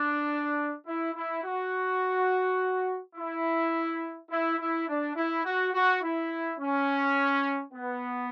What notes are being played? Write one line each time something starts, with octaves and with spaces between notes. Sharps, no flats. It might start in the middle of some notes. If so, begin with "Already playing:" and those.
Already playing: D4
E4
E4
F#4
E4
E4
E4
D4
E4
F#4
F#4
E4
C#4
B3